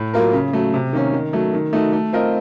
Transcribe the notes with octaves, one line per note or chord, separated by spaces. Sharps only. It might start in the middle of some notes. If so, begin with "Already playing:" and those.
Already playing: A2
F#3 A#3 F4 A#4
C#3
F#3 A3
C3
D#3 A#3 C#4
D#3
F#3 A3
D#3
A3 D#4 F#4
A3
C4 F4 A#4 D#5